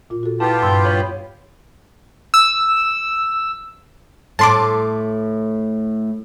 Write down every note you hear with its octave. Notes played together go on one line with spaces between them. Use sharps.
A#2 F4
F#4 A4
B3 E4 F4 G4 A5
G2 F#5 C6 E6 G6
C#5 F5 B5
E6
A2 A5 C6 D6